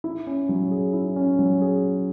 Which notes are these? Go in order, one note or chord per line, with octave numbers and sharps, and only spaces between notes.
E4
C#4
F#3
G#4
E4
C#4
F#3
G#4